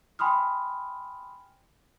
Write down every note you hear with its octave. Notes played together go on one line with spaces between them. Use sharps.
G5 G#5 B5 C6 D#6 F6